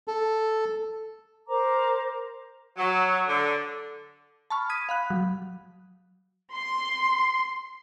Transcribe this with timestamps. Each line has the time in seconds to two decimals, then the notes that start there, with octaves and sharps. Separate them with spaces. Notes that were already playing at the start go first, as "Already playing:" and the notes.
0.08 A4
1.48 A#4 C5 A#5 D6
2.77 F#3
3.27 D3
4.50 A5 B5 C#6 F6
4.69 D#6 G#6 B6 D#7
4.89 F5 B5 F#6
5.10 F#3
6.53 C6